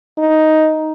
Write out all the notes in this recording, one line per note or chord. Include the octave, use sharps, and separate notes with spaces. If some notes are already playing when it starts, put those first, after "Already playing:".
D#4